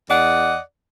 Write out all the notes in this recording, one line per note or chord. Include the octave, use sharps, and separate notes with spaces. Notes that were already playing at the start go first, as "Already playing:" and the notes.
E2 D5 D#5 F#5